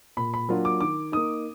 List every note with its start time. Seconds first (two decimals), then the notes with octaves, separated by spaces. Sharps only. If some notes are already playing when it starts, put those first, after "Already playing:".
0.17 A#2 B5
0.34 B5
0.49 F#3 A#3 D4 F4
0.65 D6
0.81 D#3 D6
1.12 A#3 D#4 D#6